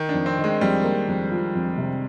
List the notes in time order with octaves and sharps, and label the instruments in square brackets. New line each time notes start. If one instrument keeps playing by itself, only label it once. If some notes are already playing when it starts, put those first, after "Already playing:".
Already playing: [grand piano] D#3
[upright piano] F2 [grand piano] D4
[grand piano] C4
[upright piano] D#3
[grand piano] G#3
[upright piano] F2 [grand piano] G3
[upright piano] A#3
F2
F3
F2
C3